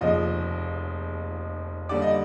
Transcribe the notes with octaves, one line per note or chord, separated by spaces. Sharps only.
F1 D#2 C#3 F3 D#5
D#2 D3 G3 D5
D#5